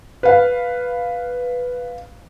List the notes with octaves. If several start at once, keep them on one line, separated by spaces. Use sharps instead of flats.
B4 F5